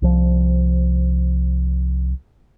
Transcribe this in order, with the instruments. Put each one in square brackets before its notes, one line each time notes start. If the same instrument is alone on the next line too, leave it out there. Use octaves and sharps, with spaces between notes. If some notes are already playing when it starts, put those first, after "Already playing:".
[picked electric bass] C2 F3